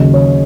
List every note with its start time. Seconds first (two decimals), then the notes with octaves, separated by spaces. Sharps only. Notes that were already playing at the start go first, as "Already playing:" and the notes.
Already playing: D#2 C#3 F#3 D#5
0.14 C#5